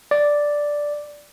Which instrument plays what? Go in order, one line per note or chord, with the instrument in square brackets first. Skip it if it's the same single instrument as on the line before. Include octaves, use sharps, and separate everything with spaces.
[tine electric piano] D5